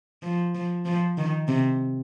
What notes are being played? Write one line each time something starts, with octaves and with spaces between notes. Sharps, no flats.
F3
F3
F3
D#3
C3